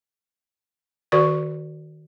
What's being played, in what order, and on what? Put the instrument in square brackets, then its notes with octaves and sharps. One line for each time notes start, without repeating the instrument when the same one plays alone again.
[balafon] D#3 F#4 A#4 D5 C#6